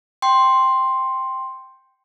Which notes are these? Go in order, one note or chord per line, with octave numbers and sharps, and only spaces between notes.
G5 C6